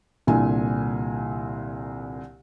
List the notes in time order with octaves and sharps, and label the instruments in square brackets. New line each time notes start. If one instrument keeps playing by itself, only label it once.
[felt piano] C2 A#2 D3 G#5